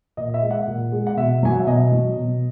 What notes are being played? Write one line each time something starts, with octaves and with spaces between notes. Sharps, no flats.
A#2 D#5
E5
G#3
F#5
A#2
G#3
F#5
B2 E5
F#3 G#5
F#5
E5
B2 D#5
F#3
B2